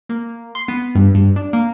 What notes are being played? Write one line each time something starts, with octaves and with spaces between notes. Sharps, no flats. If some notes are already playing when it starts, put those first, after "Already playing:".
A#3
C6
B3
G2
G2
D4
A#3